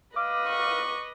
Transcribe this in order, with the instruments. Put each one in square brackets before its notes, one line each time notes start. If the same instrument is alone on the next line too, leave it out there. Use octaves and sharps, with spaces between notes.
[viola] B4 D#5 [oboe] F5 [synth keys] D6
[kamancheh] C#6